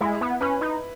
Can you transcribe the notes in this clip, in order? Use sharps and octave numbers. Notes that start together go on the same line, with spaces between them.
G#3 E4
B3
C#4 B4
D#4